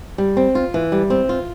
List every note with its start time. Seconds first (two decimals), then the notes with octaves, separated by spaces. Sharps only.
0.18 G3
0.37 C4
0.55 F4
0.74 E3
0.92 G3
1.10 C4
1.29 F4